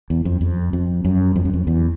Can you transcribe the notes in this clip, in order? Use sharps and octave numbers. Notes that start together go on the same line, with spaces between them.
E2
F2
F2
F2
F#2
F2
F#2
F2
E2